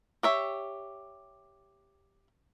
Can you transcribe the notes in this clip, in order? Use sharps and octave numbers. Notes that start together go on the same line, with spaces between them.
G4 C#5 E5